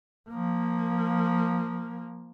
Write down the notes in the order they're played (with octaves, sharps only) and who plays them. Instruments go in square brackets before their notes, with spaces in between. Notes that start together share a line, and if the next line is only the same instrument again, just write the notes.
[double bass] F3 A#3